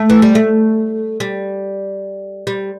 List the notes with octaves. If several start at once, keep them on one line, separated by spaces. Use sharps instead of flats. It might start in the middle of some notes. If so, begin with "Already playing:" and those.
Already playing: A3
E3
G3
A3
G3
G3